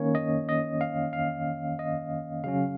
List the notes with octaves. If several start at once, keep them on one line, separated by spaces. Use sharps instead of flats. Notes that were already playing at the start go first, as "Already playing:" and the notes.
Already playing: D#3 A#3 C#4 C#5
D#5
D#5
F5
F5
D#5
C#3 F#3 C#4 F5